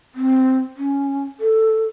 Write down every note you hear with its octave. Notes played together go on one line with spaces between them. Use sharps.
C4
C#4
A4